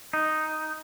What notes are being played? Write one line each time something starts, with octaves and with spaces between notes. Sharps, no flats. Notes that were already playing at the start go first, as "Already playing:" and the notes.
D#4